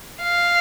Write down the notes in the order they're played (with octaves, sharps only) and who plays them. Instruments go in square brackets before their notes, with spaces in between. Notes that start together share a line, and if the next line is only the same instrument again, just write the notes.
[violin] F5